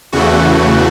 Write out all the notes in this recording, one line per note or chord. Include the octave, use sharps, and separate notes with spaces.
E2 C#3 E3 A3 F#4